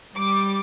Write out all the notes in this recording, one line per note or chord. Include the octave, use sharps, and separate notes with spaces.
G3 D6